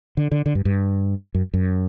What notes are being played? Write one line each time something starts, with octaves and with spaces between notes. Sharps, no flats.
D3
D3
D3
G2
G2
F#2
F#2